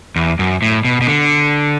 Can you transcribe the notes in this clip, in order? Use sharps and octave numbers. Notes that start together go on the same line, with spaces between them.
E2
F#2
A2
B2
B2
D3